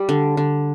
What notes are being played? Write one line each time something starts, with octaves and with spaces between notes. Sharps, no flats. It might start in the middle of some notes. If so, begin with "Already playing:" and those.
Already playing: G3
D3
D3